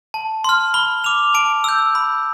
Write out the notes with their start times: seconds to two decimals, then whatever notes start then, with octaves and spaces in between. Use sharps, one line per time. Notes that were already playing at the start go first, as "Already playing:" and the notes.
0.14 A5
0.44 C6 F6
0.74 B5 G7
1.04 D6 F6 F7
1.34 A5 D7
1.64 E6 G6
1.95 B5